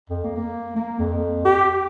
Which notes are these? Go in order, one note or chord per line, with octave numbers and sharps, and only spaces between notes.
F2
A#3
A#3
A#3
F2
G4